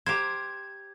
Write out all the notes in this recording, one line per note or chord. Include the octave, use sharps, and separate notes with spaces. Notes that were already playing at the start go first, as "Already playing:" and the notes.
G4 A#4 C5 G#6